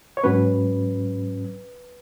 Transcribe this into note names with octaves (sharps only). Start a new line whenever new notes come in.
C#5
G#2 F#3 C#4 B4